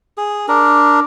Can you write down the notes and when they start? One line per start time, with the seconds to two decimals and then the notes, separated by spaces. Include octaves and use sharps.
0.18 G#4
0.48 D4 A#4